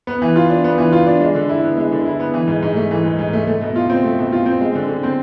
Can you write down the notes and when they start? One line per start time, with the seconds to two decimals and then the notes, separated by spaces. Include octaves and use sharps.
0.07 B3
0.22 E3
0.36 F4
0.50 D4
0.64 B3
0.78 E3
0.93 F4
1.07 D4
1.20 G#3
1.35 D3
1.49 E4
1.63 B3
1.77 G#3
1.92 D3
2.05 E4
2.20 B3
2.34 E3
2.48 G#2
2.62 G#2
2.76 A3
2.91 E3
3.05 G#2
3.19 G#2
3.33 A3
3.47 A3
3.61 B2
3.76 F4
3.90 C4
4.04 A3
4.19 B2
4.33 F4
4.46 C4
4.61 G#3
4.75 D3
4.88 D3
5.03 C4